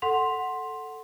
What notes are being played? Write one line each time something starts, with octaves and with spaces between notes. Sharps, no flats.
A4 F#5 C6 B6 F7